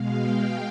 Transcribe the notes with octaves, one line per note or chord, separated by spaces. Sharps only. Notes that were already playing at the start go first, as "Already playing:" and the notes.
Already playing: B2 G#3 F5
G5